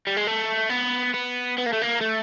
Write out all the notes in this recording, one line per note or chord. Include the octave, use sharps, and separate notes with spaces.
G3
G#3
A3
B3
B3
B3
A#3
A3
A#3
A3